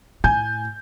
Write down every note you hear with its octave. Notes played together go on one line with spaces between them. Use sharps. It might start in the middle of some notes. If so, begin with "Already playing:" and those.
A2 G#5 G6